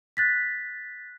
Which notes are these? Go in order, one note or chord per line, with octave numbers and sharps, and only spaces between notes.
F#6 A6 B6